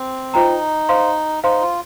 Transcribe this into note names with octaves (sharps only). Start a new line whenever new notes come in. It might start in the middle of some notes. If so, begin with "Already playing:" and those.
Already playing: C4
D#4 F4 C5 G5 A#5
C5 F5 C6
D#4 C5 F5 C6
F4